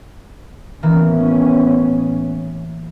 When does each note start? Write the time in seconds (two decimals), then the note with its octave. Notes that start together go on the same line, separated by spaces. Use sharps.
0.83 A1 E3 A#3 B3 C#4